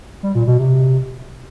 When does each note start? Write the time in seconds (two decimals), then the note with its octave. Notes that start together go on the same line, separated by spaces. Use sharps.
0.23 G3
0.35 A#2
0.47 B2
0.59 C3